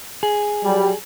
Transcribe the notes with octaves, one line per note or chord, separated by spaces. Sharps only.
G#4
F#3 G3